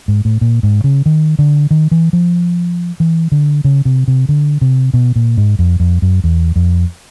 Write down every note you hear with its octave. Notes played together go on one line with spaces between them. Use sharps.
G#2
A2
A#2
G#2
C#3
D#3
D3
D#3
E3
F3
E3
D3
C#3
C3
C3
D3
C3
B2
A#2
G#2
F2
F2
F#2
E2
F2